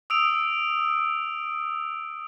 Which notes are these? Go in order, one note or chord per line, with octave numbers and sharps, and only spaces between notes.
D#6 E6 D7 F7